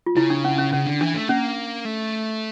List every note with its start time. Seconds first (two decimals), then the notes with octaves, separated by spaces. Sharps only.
0.06 F4
0.16 C#3 E4
0.30 D4
0.45 C#4
0.58 C#4
0.73 C#3 C#4
0.87 D3
1.01 E3 D4
1.15 A3
1.29 A#3 C#4
1.85 A3